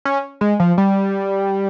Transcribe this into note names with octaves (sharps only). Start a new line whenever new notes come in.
C#4
G#3
F3
G3